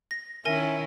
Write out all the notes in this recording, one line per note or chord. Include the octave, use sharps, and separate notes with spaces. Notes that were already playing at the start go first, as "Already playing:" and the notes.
A#6
D#3 C#4 E4 A#4 E5 G#5 A#6